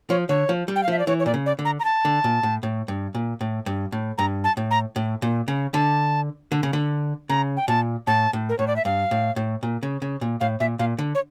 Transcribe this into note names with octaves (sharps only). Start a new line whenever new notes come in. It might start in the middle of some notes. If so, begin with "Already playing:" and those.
F3 C#5
D3 C#5
F3
G3
G5
F5
F3 E5
D5
E3 C#5
C#5
A#2 D5
C#3
D5
D3
A#5
A#5
A5
D3
A#2
A2
A2
G2
A#2
A2
G2
A2
G2 A#5
A5
A2
A#5
A2
A#2
C#3
D3 A5
D3
C#3
D3
C#3 A#5
G5
A#2 A5
A2 A5
A2
A#4
A2 C#5
D5
E5
G2 F5
A2
A2
A#2
C#3
C#3
A#2
A2 F5
A#2 E5
A#2 F5
D3
C#5